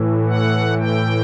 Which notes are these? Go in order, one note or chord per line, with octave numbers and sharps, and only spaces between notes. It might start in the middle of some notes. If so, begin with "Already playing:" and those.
Already playing: A2 E3
F#5
G5